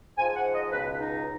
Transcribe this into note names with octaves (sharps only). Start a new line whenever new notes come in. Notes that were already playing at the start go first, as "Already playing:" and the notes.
G#2 F3 G#5
F#5
D#5
C#2 B2 B4
D#4